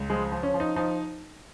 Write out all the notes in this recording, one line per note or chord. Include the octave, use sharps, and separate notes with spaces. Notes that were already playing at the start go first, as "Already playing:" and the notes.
Already playing: C#2
F3 G#3
F3
C#4
F3
D#4
F3 D#4